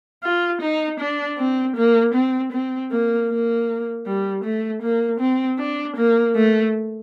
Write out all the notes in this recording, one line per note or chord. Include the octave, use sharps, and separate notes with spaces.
F4
D#4
D4
C4
A#3
C4
C4
A#3
A#3
G3
A3
A#3
C4
D4
A#3
A3